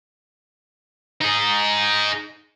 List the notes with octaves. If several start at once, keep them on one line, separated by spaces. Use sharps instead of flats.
D#4 G#4